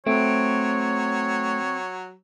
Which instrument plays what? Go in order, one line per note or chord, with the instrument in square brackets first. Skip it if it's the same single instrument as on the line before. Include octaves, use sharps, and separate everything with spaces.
[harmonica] F#3 [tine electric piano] A3 [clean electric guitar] C4 [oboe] C#5